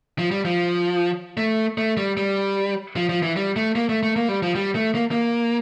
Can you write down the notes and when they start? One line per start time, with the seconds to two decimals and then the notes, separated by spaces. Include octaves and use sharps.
0.18 F3
0.31 G3
0.45 F3
1.37 A3
1.78 A3
1.97 G3
2.17 G3
2.96 F3
3.09 F3
3.23 E3
3.36 G3
3.56 A3
3.76 A#3
3.89 A3
4.03 A3
4.16 A#3
4.29 G3
4.42 F3
4.55 G3
4.75 A3
4.95 A#3
5.11 A#3